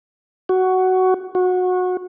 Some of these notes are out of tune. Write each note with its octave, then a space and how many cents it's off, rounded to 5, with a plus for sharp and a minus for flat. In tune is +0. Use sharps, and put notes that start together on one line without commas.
F#4 +10
F#4 -20